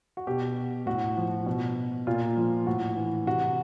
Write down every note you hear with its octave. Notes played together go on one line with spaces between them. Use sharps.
F#4
B2 G4
A2 F#4
F3
B2
A#2 F4
F3
A2 F#4
E3
C3 F#4